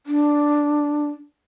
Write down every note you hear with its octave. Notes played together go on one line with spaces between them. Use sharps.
D4